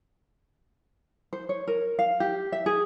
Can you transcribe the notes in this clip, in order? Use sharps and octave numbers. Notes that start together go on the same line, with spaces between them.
C5
C#5
A#4
F5
G4
E5
G#4